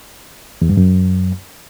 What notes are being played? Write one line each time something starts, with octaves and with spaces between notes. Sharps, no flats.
E2
G2
F#2